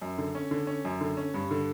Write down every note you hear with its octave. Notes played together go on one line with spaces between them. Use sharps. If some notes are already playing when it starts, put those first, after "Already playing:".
F#2
D3
C#4
D3
C#4
F#2
D3
C#4
G2
D3